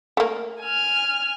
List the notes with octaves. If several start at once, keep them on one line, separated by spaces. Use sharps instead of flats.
A3 A#3
G#5 F6